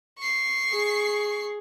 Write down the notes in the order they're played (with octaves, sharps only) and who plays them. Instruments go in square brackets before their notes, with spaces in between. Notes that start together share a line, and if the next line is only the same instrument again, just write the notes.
[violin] C#6 C7
[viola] G#4